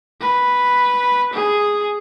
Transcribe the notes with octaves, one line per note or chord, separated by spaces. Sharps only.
B4
G#4